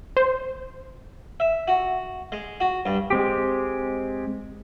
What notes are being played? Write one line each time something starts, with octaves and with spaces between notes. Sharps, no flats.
C5
E5
F#4
G#3
F#4
G2
G#3 C4 G4